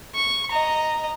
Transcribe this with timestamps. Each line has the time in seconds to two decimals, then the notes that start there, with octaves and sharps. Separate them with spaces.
0.14 C#6
0.51 D#5 A#5